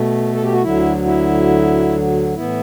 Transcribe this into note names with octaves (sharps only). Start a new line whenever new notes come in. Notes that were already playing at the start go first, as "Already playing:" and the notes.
Already playing: B2 A3
A4
G4
F#4
D2 D3 F#3 E4
E4
A2 E3 B3 E4